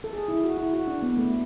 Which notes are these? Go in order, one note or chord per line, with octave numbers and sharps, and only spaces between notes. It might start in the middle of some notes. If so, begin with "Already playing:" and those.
A4
G#4
E4
F#4
E4
F#4
D4
B3
A3